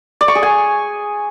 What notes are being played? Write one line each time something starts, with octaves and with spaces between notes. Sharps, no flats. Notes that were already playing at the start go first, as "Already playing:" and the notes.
D5
C#6
G#4
G#5